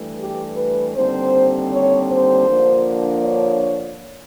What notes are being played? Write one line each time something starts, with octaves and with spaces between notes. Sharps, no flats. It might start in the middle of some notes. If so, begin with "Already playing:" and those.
Already playing: G2 E3 A3
G4
B4
D#2 D3 G3 C4 C5
C#5
C5
D3 F3 A#3 D4
C#5